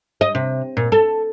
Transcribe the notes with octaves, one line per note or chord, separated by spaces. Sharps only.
D#5
C3
A#2
A4